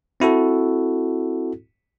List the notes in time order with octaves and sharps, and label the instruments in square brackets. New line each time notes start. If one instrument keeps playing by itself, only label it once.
[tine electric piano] C4 E4 F#4 A4